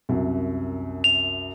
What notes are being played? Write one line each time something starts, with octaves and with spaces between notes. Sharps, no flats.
C2 F#2
F7